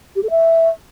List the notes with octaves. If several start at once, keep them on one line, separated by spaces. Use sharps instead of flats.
G4
A4
E5